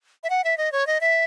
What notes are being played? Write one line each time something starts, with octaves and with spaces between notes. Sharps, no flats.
E5
F#5
E5
D#5
C#5
D#5
E5